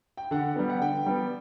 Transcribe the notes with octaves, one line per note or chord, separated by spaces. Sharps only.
G5
D3 F#5
G3 B3
F#5
D3 G5
G3 B3